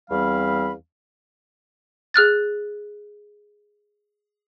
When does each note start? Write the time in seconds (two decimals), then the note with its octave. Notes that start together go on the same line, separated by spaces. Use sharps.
0.11 E2 G3 C4 F5 B5
2.14 G#4 F6 F#6 A6